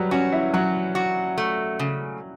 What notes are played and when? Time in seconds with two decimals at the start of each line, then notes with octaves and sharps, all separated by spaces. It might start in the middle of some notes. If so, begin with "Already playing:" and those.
Already playing: F#3 G3 B4
0.11 C#4 F#4
0.32 E4
0.53 F#3 F#4
0.95 F#4
1.38 A3
1.79 C#3